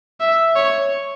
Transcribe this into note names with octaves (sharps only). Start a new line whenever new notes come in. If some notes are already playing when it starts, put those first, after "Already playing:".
E5
C#5